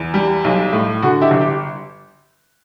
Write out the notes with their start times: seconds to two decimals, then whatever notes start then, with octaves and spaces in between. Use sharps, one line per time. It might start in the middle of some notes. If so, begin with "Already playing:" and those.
Already playing: E2
0.14 G3
0.44 B1
0.73 A2
1.02 D3 F#4
1.21 E4 G4
1.31 G1
1.41 G4